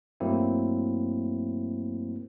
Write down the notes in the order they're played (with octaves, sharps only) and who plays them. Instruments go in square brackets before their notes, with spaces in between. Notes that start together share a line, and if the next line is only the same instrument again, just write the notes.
[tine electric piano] G2 F#3 A3 A#3 C4 E4